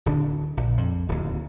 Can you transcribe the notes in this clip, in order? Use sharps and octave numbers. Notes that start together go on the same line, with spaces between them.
D1 D3 D4
A#1
F2
D1 D#2